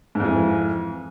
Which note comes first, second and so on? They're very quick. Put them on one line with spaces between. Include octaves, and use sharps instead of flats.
G#2 F2 E3